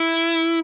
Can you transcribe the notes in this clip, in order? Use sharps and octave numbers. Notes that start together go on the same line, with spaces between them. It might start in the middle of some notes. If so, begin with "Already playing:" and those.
Already playing: E4